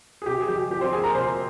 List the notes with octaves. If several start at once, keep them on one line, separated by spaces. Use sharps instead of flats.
G#4
C3 G4
G#4
F2 G4
F3 G4
C4 C5
A#3 G#4 G#5
A#4 A#5
C3 C5 C6